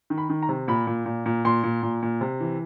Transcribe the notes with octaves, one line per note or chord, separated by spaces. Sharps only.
D#3
B5
D#3
A#5
C3
A#2 B5
A#2
A#2
A#2
A#2 C6
A#2
A#2
A#2
C3
E3